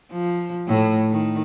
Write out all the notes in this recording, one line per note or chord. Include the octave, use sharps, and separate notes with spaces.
F3
A2
D#3